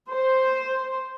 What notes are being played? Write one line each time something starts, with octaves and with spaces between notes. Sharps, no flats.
C5